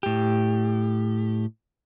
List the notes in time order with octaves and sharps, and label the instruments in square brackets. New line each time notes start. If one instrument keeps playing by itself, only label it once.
[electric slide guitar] A2 G4